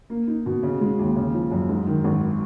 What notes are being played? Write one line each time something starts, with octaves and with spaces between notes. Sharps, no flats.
A#3
D#4
B2
C#3
G#3
D#2
C#3
F3
F#2
G#2
D#3
G#1